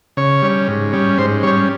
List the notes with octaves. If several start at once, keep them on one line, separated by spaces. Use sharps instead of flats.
C#3 C#5
G3 C#4
G#2
G3 C#4
G#2 C5
G3 C#4 C#5